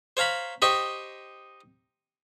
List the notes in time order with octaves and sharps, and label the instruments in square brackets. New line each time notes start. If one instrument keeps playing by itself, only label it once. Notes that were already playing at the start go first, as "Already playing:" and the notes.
[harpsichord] C5 C#5 F5 A#5 B5
D#4 G4 C5 D#5 G5 C#6